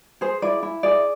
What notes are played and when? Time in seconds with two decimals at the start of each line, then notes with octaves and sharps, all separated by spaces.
0.21 G#4 C5
0.42 E4 D5
0.63 E4
0.83 G#4 D5